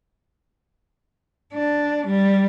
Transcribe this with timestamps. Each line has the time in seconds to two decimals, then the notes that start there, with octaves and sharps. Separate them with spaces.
1.53 D4
2.07 G3